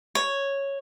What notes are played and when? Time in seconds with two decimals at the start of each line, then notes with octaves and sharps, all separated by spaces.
0.15 C#5